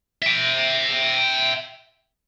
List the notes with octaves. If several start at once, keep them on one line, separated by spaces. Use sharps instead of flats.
E5 G5